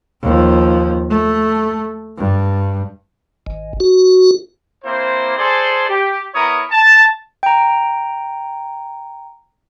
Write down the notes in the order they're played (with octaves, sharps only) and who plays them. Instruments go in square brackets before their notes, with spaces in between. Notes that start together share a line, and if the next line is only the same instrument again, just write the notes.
[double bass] D#2 F3
A3
G2
[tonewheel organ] G#1
F#4
[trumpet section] A#3 C4 E4 C5
G#4 A4 C5 D5 G#5 C6
G4
B3 E4 A#4 C#5 A#5 D#6
A5
[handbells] G5 A#5